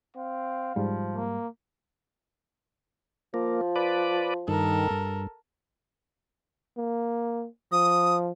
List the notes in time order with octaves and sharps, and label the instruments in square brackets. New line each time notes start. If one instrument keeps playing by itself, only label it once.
[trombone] C4 [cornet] F5
[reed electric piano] G#2 G3 [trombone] F3
[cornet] A#3
[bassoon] F3 [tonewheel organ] A#3
[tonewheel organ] B4 D5
[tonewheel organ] G2 D#3 [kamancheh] A4 A#4
[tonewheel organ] G2
[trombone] A#3
[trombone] F3 [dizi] D#6